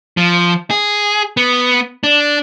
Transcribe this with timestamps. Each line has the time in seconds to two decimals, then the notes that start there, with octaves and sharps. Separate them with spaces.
0.17 F3
0.70 G#4
1.37 B3
2.04 D4